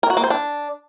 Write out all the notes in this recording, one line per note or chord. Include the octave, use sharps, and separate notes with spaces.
A#4
F#4
A#3
C5
D4